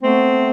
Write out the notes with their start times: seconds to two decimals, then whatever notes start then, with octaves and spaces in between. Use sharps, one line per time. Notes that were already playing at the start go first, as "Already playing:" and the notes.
0.02 A3 B3 C4